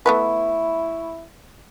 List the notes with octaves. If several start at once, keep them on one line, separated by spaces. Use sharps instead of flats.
A3 B3 E4 B4 E5 B5 C#6